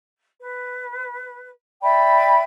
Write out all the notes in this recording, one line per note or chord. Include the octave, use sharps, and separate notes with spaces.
B4
D5 E5 G5 B5